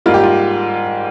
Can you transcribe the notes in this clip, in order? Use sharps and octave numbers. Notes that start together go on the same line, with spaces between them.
G#2 G3 A#3 F4
G4
F4